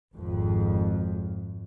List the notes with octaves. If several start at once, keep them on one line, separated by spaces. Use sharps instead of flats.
G#1 F2